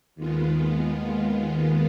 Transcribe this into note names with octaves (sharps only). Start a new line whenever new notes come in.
D#2 D#3 G#3 B3 F4